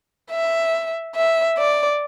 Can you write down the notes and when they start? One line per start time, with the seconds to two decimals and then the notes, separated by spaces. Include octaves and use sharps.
0.31 E5
1.15 E5
1.58 D5